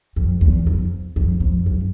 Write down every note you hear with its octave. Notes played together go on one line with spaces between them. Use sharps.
F2
E2
F2
F2
F2
F#2